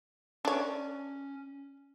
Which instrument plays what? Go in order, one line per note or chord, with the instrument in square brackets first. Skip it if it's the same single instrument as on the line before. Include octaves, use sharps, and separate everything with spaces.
[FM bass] C#4 [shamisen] D4 C#5